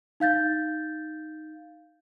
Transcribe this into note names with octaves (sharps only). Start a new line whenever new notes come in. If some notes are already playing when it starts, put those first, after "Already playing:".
D#4 F5 G6 A6